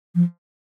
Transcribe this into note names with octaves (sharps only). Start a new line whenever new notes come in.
F3